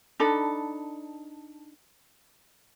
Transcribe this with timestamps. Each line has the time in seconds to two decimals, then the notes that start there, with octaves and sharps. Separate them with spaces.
0.20 D4 D#4 A4 B5